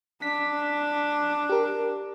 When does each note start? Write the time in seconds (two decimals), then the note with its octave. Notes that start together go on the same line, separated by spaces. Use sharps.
0.22 D4 B6
1.49 G4 A#4